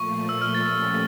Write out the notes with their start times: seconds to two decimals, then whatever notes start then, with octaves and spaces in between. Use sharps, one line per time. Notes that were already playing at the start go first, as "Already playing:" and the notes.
Already playing: A#2 F3 A3 C#6
0.29 E6
0.42 F6
0.55 A6
0.68 A#2 F3 A3 C#4 G4